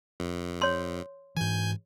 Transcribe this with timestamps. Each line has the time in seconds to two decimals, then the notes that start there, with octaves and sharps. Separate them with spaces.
0.20 F2
0.62 C#5 C6
1.37 G#2 E3 G#5 G6